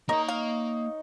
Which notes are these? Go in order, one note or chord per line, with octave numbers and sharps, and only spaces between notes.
A#3 D#4 A#4 C#5 D#5 A#5
F5